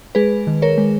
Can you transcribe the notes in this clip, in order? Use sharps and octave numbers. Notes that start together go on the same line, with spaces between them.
G#3 G#4 B4
D#3
A#4 C#5
G#3